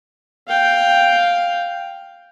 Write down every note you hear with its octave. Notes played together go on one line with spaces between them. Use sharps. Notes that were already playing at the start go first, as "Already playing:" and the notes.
F5 G5